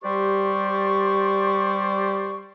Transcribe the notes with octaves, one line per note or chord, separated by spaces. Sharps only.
G3 G4 C5 D5 C#6